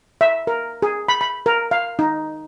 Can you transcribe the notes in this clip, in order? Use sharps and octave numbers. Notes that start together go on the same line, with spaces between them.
E5
A#4
G#4
B5
B5
A#4
F5
D#4